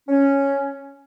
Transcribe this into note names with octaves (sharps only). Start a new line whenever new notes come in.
C#4